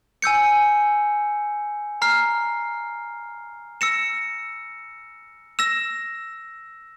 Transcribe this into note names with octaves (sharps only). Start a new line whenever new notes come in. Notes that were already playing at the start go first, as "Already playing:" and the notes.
G#5 E6 G6 C#7
A#5 F6 C7
E6 A#6 C#7 E7
E6 A#6 E7